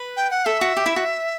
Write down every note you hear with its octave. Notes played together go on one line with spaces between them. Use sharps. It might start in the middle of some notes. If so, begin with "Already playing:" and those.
Already playing: B4
G5
F#5
A4 E5
F#4
G4
E4
F#4